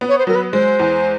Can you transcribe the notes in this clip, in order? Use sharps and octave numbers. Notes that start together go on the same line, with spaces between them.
B3
C#5
C5
F#3 A#4
B4
G#3 C5
E2